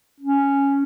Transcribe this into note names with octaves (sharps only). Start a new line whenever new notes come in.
C#4